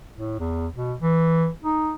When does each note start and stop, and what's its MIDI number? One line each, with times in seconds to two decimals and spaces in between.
0.16 0.37 45
0.39 0.67 40
0.75 0.94 47
1.00 1.48 52
1.64 1.94 63